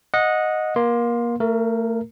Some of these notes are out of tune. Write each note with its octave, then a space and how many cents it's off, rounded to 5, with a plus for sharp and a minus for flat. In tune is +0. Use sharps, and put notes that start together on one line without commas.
D#5 +0 F#5 -20
A#3 +25 C6 +0
A3 +35 A#4 +0